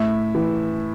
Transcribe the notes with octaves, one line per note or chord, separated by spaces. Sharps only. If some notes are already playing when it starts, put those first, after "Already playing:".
Already playing: A2 E5
E3